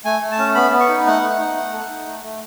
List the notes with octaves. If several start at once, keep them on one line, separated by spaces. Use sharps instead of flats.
A3 G#5
A3
A5
C#4
B3 B5
B3
C#6
D#4
A3 F#5
A3
D#4
A3
A4
D#4
A3
A3